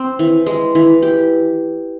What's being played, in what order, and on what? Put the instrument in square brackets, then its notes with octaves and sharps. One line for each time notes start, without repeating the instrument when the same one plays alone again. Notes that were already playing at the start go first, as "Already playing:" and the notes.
Already playing: [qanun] C4
E3
G#3
E3
G4